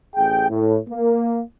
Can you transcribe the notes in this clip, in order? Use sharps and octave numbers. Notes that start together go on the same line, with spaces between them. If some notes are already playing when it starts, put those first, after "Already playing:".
A1 G#4 G5
A2
A#3